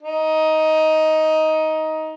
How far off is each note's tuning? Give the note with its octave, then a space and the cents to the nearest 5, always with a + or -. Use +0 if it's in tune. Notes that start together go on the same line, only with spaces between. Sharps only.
D#4 +10